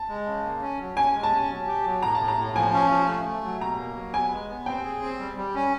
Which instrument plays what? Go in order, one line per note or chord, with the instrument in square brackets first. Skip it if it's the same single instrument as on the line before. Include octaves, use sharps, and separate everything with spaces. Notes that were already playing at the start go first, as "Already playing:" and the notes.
Already playing: [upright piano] A5
[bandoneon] G#3
C#3
A#3
C#4
F#3
[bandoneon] C#4 [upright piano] G#5
[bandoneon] G#3
[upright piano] A5
[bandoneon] C#4
F#3
G4
F#3
[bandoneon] A2 [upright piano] A#5
[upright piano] A5
[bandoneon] A2
[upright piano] A#5
[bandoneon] A2
[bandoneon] F3 [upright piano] G#5
[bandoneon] C#4
F3
A3
A3
F#3
[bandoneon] B2 [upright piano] A#5
[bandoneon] A#3
F#3
[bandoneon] B3 [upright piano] G#5
[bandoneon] G#3
B3
[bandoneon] C4 [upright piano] G5
[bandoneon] G#4
C4
G3
G3
C#4